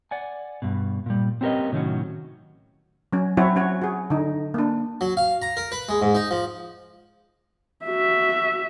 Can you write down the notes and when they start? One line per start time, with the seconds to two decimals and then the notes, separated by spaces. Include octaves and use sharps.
0.11 D5 F#5 G#5
0.62 G2 B2
1.06 A#2 G3
1.41 C4 C#4 G4 A#4 B4 D#5
1.72 A2 C3 D#3 F#3 C#4 F#4
3.13 F#3 C#4
3.37 F#3 C4 E4 F#4 C#5
3.56 C#4 F#4 C#5
3.82 F#4 G#4
4.10 D3 D#4
4.54 A#3 D4
5.01 F#3
5.17 F5
5.42 A#5
5.57 A#4
5.72 B4
5.89 G#3
6.02 G#2
6.15 D#4
6.31 F3
7.86 F#4 E5